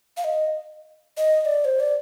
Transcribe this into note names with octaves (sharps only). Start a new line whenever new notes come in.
F5
D#5
D#5
D#5
D5
C5
D5